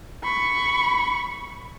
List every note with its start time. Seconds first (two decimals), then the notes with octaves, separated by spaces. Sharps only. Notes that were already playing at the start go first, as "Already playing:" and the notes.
0.24 B5 C#6